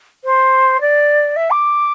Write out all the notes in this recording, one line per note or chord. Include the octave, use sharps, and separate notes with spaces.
C5
D5
E5
D6